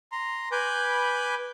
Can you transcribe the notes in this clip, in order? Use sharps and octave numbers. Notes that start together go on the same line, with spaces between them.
A#5 C6
B4 G#5 B5 D6 G6